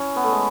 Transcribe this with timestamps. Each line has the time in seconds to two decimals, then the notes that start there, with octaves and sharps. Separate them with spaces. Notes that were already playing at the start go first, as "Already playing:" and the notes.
Already playing: C#4 E4
0.16 B3
0.24 A3
0.32 G#3